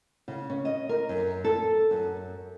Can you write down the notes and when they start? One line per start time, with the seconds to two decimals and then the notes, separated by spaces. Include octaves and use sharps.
0.28 C#3
0.50 C#4
0.65 D#5
0.89 A#4
1.09 F#2
1.45 A4
1.91 F#2